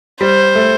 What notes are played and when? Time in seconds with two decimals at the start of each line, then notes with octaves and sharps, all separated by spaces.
0.21 G3 C5
0.55 A3